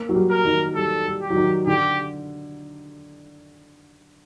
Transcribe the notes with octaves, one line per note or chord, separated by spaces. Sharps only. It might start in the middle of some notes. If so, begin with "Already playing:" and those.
Already playing: A#3
F#3
G3
A#4
D#3
G3 A4
G3
G4
F#3
D#3
D3 G4